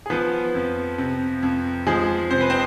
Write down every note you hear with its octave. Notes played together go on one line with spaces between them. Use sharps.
G#4
F3 B3 B4
F2
C3
F2
F3 G#3 G#4
C3 C5
B4
C4 C5